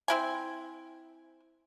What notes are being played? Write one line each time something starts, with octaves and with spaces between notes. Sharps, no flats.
C4 E4 G#5